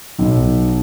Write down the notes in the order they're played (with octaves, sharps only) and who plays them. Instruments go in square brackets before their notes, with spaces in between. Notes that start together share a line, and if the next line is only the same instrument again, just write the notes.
[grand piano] B1